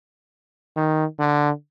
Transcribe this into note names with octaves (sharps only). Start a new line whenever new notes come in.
D#3
D3